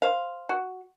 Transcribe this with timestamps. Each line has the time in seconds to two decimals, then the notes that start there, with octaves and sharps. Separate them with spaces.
0.02 C5 F5
0.49 F#4